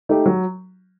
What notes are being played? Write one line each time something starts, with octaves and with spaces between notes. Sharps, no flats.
A3 D#4 G4
F#3